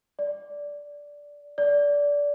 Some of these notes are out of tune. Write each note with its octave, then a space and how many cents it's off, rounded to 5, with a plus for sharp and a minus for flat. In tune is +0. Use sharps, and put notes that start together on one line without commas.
D5 -10
D5 -20